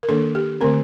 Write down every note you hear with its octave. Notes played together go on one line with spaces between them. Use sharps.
A#4
D#3 A#3 D4 A4
G4
D3 A3 C4 A#4